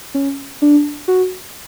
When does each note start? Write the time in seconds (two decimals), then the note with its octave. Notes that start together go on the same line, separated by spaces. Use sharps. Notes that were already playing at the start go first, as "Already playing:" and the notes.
0.14 C#4
0.62 D4
1.08 F#4